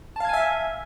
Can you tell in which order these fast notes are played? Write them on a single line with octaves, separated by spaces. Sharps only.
A5 F5 G#6 G#5 E5